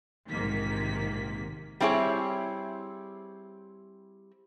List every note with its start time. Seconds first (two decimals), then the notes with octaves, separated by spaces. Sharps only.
0.29 A#1 G#2 C3 D#3 A#3 B6
1.80 G3 C4 E4 G#4 C#5